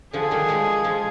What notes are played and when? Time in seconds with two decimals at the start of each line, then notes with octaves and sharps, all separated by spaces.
0.13 D3 F3 G#4
0.31 D#3 G3
0.49 F3 G#3
0.84 F3 G#3